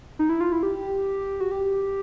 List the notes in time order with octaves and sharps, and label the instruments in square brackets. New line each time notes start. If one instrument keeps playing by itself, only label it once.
[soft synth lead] D#4
E4
F4
E4
G4
F#4
G4